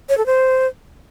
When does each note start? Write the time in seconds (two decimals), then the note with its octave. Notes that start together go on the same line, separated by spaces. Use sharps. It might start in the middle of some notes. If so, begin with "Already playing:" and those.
0.09 C#5
0.17 A4
0.26 C5